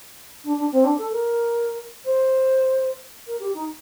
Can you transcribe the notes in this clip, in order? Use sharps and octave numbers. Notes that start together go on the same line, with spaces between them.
D4
D4
C4
D4
A4
A#4
C5
A#4
G4
D#4